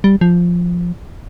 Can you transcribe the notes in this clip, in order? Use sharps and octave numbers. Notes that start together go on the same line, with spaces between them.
G3
F3